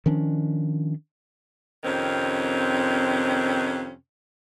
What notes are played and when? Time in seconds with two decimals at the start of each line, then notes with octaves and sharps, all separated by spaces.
0.06 D#3 F3 C#4 D4
1.84 F2 C3 D#3 C4 C#4